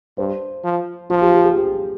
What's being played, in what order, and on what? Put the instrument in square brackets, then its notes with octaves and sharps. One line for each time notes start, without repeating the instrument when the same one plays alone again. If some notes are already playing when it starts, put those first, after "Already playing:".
[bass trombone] G2 [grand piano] C5
[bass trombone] F3
[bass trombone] F3 [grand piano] F4
[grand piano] G4
G4
G#4
G4